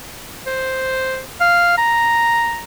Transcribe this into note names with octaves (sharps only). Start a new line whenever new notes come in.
C5
F5
A#5